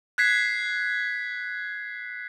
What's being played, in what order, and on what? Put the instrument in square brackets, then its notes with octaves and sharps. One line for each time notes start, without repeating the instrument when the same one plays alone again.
[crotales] F#6 G#6 B6 C7